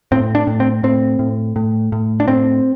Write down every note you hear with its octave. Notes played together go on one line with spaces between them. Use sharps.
A2 C4
D4
A2
C4
A2 C4
A2
A2
A2
D4
A2 C4